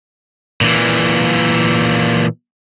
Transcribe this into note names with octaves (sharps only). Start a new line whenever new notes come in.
A#2 E3